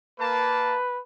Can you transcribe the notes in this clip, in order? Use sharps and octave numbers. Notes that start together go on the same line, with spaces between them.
A#3 B4 A5